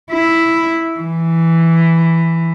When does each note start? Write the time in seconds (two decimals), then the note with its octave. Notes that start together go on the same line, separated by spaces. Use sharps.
0.12 E4
1.01 E3